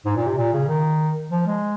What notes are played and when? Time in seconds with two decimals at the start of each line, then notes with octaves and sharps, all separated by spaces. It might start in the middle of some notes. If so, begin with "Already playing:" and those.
0.05 G#2
0.16 A#2
0.26 C3
0.37 A#2
0.53 C#3
0.68 D#3
1.31 F3
1.47 G#3